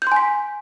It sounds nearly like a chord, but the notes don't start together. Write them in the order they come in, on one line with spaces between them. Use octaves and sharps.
G6 C6 G#5 B6